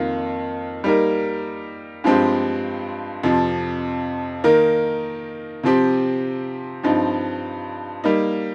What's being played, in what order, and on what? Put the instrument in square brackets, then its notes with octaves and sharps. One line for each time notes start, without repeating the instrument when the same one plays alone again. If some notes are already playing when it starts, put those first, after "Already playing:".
Already playing: [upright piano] F2 D#3 A#3 F4
G3 A#3 D#4 A#4
G2 F3 G#3 C4 G4
F2 C3 F3
D#3 A#3 D#4 A#4
C3 F3 C4 G4
G2 F3 C4 D#4
G3 A#3 D#4